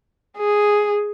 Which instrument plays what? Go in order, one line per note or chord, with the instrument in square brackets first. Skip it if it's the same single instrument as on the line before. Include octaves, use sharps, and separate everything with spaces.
[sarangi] G#4